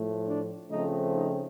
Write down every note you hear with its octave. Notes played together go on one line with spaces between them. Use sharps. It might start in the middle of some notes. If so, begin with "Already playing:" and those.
Already playing: A2 F3 A3
D4
C#3 F3 A3 C4 D#4
D#4